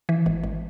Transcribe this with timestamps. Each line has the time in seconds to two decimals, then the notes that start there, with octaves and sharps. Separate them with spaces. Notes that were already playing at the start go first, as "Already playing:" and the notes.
0.09 E3
0.26 G#1
0.43 G#1